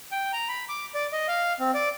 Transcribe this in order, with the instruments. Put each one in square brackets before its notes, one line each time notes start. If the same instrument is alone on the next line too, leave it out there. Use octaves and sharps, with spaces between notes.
[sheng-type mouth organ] G5
A#5
B5
D6
D5
D#5
F5
C4
D5